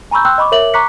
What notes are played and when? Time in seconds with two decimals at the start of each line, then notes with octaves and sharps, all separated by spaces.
0.11 G#5 A#5 B5 C#6 E6 G6
0.25 G5 C6 E6 F#6 G6
0.38 D#5 B5 C#6 D6
0.52 A#4 C#5 E5 D6 F#7
0.74 A#5 C#6 D6 F#6 B6 C#7